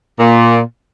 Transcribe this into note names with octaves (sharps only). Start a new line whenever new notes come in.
A#2